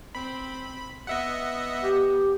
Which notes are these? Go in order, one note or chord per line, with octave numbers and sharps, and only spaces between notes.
C4 B5
B3 D#5 E5 F#5
G4